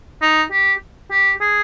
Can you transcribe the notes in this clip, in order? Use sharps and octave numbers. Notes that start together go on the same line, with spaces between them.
D#4
G4
G4
G#4